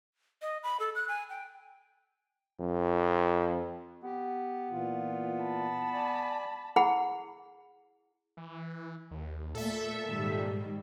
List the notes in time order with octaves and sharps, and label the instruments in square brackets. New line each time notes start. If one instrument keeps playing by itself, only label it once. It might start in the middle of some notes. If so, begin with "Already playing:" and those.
[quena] D#5
B5
A4
F#6
G#5
G5
[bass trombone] F2
[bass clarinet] B3 [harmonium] G4
[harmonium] A#2 E3 F4
[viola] A5 B5
[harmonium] D5 G#5
[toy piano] E4 G#4 F#5 B5
[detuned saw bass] E3
D#2
[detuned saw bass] A#2 [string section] A3 [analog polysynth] A4 E5
[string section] G#2 D#3 G3